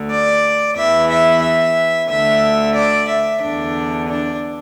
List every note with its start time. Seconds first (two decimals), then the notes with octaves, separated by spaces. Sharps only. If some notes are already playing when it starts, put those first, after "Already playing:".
Already playing: D2 D3
0.10 D5
0.77 E2 E3 E5
1.10 E5
1.43 E5
2.09 D2 D3 E5
2.75 D5
3.09 E5
3.42 E2 D3 D4
4.08 D4